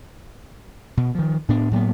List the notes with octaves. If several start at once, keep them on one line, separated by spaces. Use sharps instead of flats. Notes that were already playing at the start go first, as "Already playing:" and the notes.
B2
D#3 F3
A2 B3 D4
A2 F#3 A#3 B3